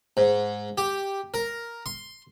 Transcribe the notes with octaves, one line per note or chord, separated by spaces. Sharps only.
G#2
G4
A#4
C6